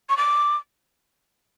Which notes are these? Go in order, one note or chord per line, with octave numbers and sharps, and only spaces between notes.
C#6
D6